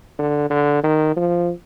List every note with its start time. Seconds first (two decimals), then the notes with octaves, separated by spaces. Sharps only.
0.19 D3
0.50 D3
0.84 D#3
1.17 F3